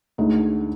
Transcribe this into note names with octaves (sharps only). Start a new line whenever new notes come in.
D2 D3 G#3 D#4